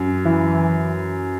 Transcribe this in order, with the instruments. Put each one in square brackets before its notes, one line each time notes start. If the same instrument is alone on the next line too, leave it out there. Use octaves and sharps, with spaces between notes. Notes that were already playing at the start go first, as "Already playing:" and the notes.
Already playing: [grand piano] F#2
[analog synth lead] E3